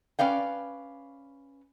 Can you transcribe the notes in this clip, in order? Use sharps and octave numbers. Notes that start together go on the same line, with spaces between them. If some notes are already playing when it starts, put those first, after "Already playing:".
C#4 B4 D5 F5 G5